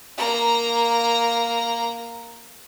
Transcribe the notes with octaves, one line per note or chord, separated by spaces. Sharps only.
A#3 A#5